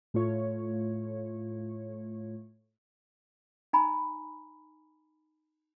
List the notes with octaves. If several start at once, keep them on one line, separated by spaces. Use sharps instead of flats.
A2 A3 F4 C#5
D#4 G#5 A#5 B5